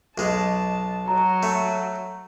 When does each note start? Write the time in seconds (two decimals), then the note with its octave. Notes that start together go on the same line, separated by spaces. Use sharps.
0.18 B1 G#3 A5
1.08 F#3 A#5
1.43 A3